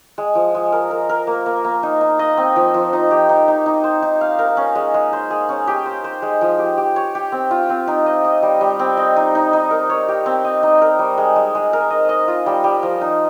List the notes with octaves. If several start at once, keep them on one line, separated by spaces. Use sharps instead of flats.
G#3
F3
G#3
A#4
A#4
A#4
A#3
A#3
A#3
D#4
D#4
D#5
C4
F3
F3
D#4
G4
D#4
D#4
D#4
C5
D#4
F5
A#4
C#4
G#3
G#3
C5
G#4
C#4
G4
C5
C5
G#3
F3
G4
G4
C#5
G4
C4
F4
C4
D#4
D#5
D#5
G3
G3
C4
D#5
D#4
D#4
D#4
A#4
C#5
G4
C4
D#5
D#4
A#4
G3
G#3
G#3
G#3
A#4
D#5
D#5
F4
G3
G3
F3
D#4